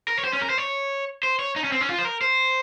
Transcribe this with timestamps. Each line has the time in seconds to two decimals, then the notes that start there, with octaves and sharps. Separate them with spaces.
0.08 A#4
0.19 C#5
0.24 C5
0.33 C#4
0.42 A#4
0.50 C5
0.58 C#5
1.23 C5
1.39 C#5
1.56 D#4
1.64 C#4
1.72 C4
1.81 C#4
1.89 F4
1.98 C5
2.05 A#4
2.21 C5